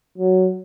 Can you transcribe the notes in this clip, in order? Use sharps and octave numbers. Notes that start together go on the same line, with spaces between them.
F#3